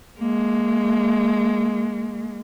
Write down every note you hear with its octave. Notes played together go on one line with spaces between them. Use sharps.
G#3 A#3